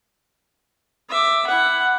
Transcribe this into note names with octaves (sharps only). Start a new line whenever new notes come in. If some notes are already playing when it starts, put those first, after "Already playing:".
E5 D6
E4 F#5